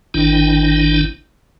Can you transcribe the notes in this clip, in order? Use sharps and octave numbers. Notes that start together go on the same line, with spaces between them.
G#1 D#3 D4 E4 G5